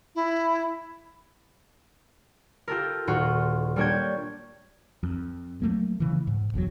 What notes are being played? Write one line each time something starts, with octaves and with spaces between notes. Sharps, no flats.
E4
F4 G4 A4 A#4
D#1 F4 F#4
G3 A#3 D4 C#5 G5 G#6
F2
F#3 A3 A#3
C#3 E3
G#2
F#1 E2 B2 F#3